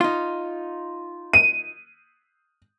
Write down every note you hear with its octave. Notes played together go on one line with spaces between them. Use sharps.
D#4 F4
D#7